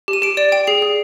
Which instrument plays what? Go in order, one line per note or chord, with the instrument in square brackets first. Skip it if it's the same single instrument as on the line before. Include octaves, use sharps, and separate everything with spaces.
[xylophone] G4
D#7
G4 D7
D5 D7
G5 D7
G#4 C7
G#4